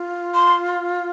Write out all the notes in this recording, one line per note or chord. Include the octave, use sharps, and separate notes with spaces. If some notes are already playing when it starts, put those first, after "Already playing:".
Already playing: F4
C6